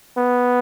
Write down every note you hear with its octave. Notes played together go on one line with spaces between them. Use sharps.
B3